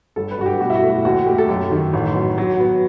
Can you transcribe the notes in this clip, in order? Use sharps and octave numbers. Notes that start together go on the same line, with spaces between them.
G1 A4
B4
G2 F#4
G4
B2 F#4
E4
F#4
A3
F#4
D#2 F#4
A3 G4
A4
F#2 G4
D#3
A1
F#3
F#3
B3